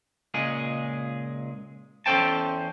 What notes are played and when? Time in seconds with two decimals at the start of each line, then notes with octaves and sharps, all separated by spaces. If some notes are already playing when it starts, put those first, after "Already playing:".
0.34 C#2 A#2 G#3 G#4
2.06 E2 C#4 A4 C5 G5 A5